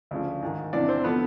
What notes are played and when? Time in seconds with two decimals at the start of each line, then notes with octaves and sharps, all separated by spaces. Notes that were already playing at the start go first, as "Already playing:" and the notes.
0.11 D2 C#3 F3
0.42 G#2 D#3
0.73 E2 C3 E3 D4 D5
0.88 C4 C5
1.04 D3 F3 B3 B4